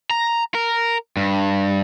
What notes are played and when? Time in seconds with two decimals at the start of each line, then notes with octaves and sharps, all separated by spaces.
0.11 A#5
0.55 A#4
1.17 G2